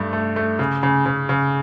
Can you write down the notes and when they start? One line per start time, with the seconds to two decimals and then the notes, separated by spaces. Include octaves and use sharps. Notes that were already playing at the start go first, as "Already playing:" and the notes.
Already playing: G2 A3
0.13 A3
0.36 A3
0.59 C#3
0.83 C#3
1.06 C#3
1.29 C#3